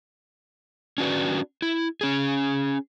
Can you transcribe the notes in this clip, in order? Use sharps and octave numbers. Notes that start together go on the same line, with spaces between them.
C#4 D4 F#4 B4
E4
C#4 G#4